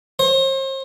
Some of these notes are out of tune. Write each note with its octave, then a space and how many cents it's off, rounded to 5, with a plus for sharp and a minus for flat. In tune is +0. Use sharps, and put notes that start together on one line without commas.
C5 +40